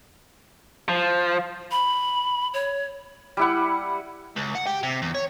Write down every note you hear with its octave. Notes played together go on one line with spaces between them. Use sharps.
F3
B5
C#5
G3 E4 F#5
C#2
F#5
G4
C3
E2
C#5